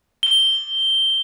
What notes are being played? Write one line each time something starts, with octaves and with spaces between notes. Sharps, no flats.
G7